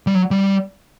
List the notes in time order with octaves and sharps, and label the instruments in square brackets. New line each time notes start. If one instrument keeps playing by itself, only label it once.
[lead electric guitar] G3
F#3
G3